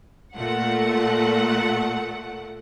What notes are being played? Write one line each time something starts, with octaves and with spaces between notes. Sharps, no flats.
A#2 A3 F#5